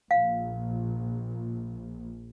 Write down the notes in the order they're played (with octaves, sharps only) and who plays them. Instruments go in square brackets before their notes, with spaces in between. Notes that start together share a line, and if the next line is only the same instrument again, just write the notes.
[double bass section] A#1 [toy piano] F5